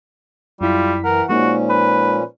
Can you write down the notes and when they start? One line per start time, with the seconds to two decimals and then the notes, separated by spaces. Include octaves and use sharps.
0.61 F#2 G3 E4 F4 B6
1.05 E3 A#4 F#5
1.29 A#2 F3 G#3 A#3 C#4 D#4 F#4
1.70 B4